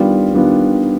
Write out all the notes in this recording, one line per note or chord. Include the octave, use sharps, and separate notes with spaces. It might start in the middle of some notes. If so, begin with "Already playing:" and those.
Already playing: D#3 G3 B3 D4 F4
D#3 G3 B3 D4 F4